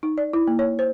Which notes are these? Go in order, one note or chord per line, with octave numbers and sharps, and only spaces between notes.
D#4
D5
E4
A#3
C#5
C5